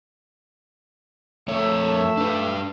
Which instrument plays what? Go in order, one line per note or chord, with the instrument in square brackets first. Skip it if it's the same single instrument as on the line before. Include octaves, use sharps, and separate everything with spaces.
[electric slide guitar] F2 C#5 [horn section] A3 E5
[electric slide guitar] D4 B4